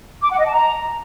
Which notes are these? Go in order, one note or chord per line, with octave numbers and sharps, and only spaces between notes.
D6
F#5
D#5
A5
A#5